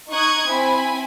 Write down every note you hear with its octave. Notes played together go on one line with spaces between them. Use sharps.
D#4 C#6 D#6 F#6 G#6
C4 E4 G#5 B5